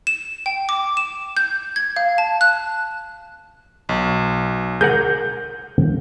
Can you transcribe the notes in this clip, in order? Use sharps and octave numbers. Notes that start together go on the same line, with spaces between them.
E7
G5
D6
E7
G6
G#6
F5
A5
F#6
B1
G#4 A#4 F#5 G6